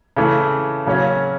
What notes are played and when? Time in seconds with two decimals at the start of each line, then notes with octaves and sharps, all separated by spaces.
0.17 C#3 E3 A3
0.87 C#3 F#3 A#3 C#4